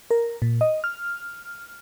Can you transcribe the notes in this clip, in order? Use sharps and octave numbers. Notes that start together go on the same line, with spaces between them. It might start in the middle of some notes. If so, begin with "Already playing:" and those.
A#4
A#2
D#5
F6